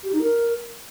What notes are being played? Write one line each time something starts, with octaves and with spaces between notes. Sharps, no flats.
G4
D#4
A#4